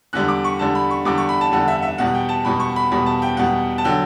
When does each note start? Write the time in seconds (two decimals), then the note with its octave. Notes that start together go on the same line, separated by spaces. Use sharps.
0.13 E2 D3 G3 F#6
0.28 D6
0.44 C#6
0.59 E2 D3 G3 A5
0.75 B5
0.90 C#6
1.05 E2 D3 G3 D6
1.18 C#6
1.29 B5
1.41 A5
1.52 E2 D3 G3 F#5
1.68 E5
1.82 E5
1.98 E2 B2 G3 F#5
2.14 G5
2.29 A5
2.45 E2 B2 G3 B5
2.60 C#6
2.76 B5
2.92 E2 B2 G3 B5
3.06 A5
3.22 G5
3.37 E2 B2 G3 F#5
3.78 A5
3.84 D3 F#3 G5